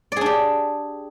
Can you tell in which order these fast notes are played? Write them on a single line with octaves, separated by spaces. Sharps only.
D5 G#4 D4 G4